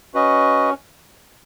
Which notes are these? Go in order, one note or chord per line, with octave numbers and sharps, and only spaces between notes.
C#4 F#4 B4 D#5